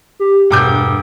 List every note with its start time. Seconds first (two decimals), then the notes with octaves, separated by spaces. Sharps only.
0.20 G4
0.51 E1 G2 D6 G6